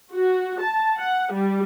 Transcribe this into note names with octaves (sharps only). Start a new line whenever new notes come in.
F#4
A5
F#5
G3